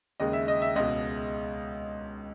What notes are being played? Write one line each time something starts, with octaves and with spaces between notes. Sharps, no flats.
D#2 C#3 G#3 D#5
E5
D#5
E5
C#2 B2 G#3 D#5